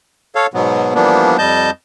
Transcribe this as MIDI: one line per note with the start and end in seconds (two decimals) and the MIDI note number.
0.35 0.46 69
0.35 0.46 73
0.35 0.46 77
0.54 0.94 44
0.54 0.94 47
0.54 0.94 54
0.54 0.94 59
0.95 1.37 52
0.95 1.37 53
0.95 1.37 55
0.95 1.37 58
0.95 1.37 59
0.95 1.37 62
1.38 1.70 41
1.38 1.70 55
1.38 1.70 75
1.38 1.70 81
1.38 1.70 91